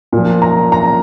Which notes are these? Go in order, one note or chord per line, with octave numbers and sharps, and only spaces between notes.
A#2 F3
A#5
A#5